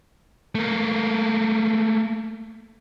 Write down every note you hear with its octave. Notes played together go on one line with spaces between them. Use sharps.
A3 A#3